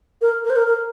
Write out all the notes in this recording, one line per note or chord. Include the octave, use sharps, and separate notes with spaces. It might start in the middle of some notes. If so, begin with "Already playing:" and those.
A#4
A#4
C5
A#4
A#4